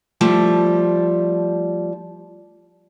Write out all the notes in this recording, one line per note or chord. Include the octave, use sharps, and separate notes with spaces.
F3 G3 A3